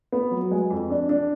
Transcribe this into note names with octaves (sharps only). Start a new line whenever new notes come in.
B3
F#3
G#3
F2
D4
D4